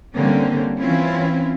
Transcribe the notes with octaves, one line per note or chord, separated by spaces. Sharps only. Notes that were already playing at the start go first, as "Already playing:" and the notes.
D3 G3 A#3 C4 C#4
E3 C4 C#4 E4 F4